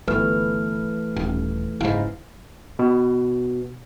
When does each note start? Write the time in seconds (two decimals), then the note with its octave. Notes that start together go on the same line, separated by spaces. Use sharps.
0.08 G1 E3 A3 B4 F6
1.16 D#1
1.81 F#1 G#2 E4 F5
2.79 B2